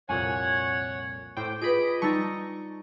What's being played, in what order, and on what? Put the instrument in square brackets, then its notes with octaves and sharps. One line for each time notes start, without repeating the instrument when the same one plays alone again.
[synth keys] C2 F2 A#2 [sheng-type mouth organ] C#5 F#5 [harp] G#5
[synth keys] A2 G5 [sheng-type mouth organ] C5 [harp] D6
[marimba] F4 B4 [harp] G#4 [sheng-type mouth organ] D#5 [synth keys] B5 D7
[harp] G3 D#4 [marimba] A5 E6 A6 [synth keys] C#6